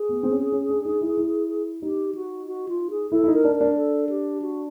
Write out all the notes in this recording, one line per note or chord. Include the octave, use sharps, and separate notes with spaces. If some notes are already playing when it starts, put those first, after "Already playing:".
Already playing: G#4
B3
C4
C#4
C#4
D4
D#4
E4
E4
D#4 G4
F#4
F#4
F4
G#4
E4 A4
E4
D#4
A#4
D4
A#4
D4
A4
G4
F#4